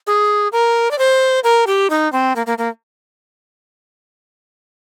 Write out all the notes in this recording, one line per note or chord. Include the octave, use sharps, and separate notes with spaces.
G#4
A#4
D5
C5
A#4
G4
D#4
C4
A#3
A#3
A#3